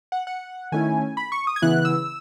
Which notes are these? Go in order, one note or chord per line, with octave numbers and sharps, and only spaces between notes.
F#5
F#5
D#3 A3 C#4 E4 G#5
B5
C#6
D#6
G#6
C#3 E3 B3 E4 F#6
E6